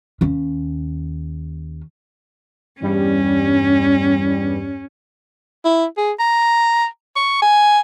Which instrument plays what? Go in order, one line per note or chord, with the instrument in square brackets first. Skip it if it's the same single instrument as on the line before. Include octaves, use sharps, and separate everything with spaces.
[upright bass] D#2 C#4
[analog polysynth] E2 G2 G3 [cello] C#4
[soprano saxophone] E4
G#4
A#5
C#6
G#5